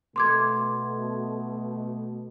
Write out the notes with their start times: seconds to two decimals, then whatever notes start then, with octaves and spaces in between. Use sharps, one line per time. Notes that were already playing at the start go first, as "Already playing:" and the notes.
0.16 B2 A3 C6 D6 G#6